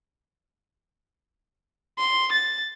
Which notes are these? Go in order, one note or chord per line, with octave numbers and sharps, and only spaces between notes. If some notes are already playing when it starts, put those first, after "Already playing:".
C6
A6